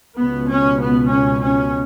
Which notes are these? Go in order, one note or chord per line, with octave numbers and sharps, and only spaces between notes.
C#2 B2 B3
C#4
B3
C#4
C#4